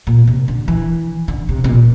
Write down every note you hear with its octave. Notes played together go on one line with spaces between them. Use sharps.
A#2
C3
D3
E3
D3
C3
C3
A#2